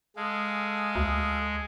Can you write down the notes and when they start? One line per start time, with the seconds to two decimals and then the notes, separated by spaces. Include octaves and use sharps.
0.16 G#3 G#4 A4 F5
0.95 D2